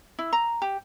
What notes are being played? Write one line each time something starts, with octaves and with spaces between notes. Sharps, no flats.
E4
A#5
G4